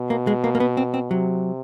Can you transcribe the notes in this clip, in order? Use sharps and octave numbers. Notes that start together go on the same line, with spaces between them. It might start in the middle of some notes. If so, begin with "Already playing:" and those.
Already playing: B2
A#3
G#3
A#3
A#3
B3
C4
C4
C3 F#3